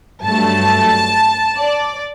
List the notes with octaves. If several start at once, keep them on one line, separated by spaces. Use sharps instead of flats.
G2 F#3 A3 A5
D5